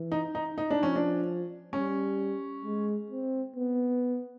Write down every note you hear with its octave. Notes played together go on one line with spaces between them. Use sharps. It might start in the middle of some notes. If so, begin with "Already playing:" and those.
Already playing: E3
D#4
D#4
D#4
D4
F3 C#4
D4
G3 C#4
G#3
C4
B3